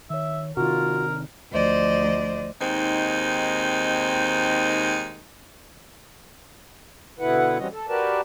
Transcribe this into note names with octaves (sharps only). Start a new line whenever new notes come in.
D#3 C#5 E5
C3 D#3 F4 F#4 A#4
D2 F3 C5 D5 D#5
D#2 G#3 C4 D#4
B2 D3 B3 E4 B4 F#5
E3 G3 C4 C#4 F#4 D#5
A4
F#4 G4 A#4 B4 D5 A5